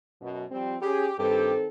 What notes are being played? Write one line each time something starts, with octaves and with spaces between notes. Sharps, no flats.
F#2 B2
F3 G3 C4
C#4 G4 G#4
G2 D#3 C4 G4 A4